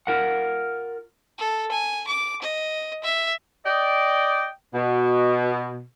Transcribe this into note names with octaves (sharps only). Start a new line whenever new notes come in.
F4 A#4 F#5
A4
G#5
D6
D#5
E5
D5 D#5 G5
B2